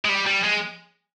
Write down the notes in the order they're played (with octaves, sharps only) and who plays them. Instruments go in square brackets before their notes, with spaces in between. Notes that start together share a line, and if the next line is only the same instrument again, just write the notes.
[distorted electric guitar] G#3
G3
G3
G#3